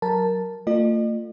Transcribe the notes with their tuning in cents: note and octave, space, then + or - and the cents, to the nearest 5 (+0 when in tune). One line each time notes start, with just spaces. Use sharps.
F#3 +0 A#4 +0 A5 +0
A3 +45 F4 +0 D#5 -45